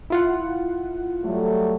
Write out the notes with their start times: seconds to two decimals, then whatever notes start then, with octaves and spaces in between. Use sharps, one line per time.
0.10 E4 F4 F#5
1.23 F#3 G3 A3